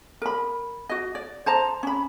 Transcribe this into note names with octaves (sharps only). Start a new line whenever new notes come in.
A#4 B5
F#4 D#5
D5
C5 A5 A#5
C#4 B5